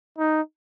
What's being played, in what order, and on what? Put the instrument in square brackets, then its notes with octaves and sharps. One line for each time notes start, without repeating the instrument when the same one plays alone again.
[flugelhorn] D#4